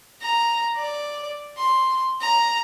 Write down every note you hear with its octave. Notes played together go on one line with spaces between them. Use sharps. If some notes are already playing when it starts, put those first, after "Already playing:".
A#5
D5
C6
A#5